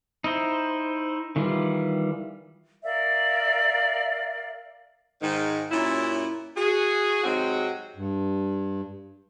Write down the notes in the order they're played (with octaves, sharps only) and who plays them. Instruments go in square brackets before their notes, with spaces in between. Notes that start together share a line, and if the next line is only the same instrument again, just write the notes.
[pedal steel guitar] D#4 E4 C5
D#3 E3 G3 F4
[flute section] A#4 D5 E5 F5
[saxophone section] G#2 D#3
F#2 A#2 C#4 E4
F#4 G#4
G#2 C3 F#3 G#3 C4 F#4
[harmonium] G2